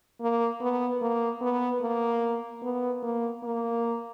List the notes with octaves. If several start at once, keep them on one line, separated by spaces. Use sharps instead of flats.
A#3
B3
A#3
B3
A#3
B3
A#3
A#3